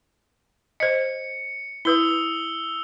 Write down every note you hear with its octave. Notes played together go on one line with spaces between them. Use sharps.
C5 D#5 C#7
E4 B4 D#6 E6 G7